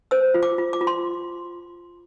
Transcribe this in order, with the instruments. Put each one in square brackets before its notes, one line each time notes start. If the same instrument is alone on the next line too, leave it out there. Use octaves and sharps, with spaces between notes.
[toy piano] C5 E6
F4
D6
F4
D6
F4
C6